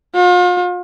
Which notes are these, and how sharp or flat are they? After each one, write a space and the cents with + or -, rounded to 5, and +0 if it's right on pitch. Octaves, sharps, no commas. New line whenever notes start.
F4 +40